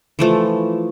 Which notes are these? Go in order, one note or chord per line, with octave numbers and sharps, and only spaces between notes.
E3 F3 A3